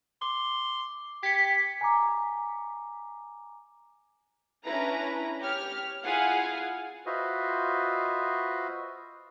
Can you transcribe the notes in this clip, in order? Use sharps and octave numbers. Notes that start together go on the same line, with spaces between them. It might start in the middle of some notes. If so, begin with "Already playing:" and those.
C6 D6
G4 G#6 B6 C#7
G#5 A#5 D6
C#4 D4 E4 B4 A#5
G4 C#5 F6
E4 F4 G#4 F5 F#5 G#5
F4 F#4 B4 C5 D#5 E5